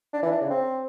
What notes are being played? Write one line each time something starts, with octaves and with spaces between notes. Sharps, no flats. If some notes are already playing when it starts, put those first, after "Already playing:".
D4
E3
D4
C#3
C4